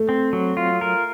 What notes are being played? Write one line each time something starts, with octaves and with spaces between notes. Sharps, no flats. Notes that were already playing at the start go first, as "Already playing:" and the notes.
Already playing: A3
C4
F#3
F4
A#4